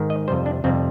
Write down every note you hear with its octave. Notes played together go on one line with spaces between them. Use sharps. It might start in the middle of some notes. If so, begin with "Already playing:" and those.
Already playing: G#2 D#3
D#5
F2 C3 G3 C5
D4
F2 C3 G3 C4